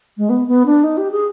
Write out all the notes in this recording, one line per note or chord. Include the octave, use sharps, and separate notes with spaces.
G#3
B3
B3
D4
D#4
G4
G#4